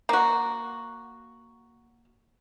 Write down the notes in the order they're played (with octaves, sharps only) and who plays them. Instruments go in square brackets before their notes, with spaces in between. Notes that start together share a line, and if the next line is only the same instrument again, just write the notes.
[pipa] A#3 F#4